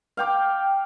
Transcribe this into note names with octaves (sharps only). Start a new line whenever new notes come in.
F5 G5 D6